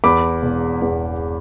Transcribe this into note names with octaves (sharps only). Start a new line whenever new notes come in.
E2 B5 D6
E1
E2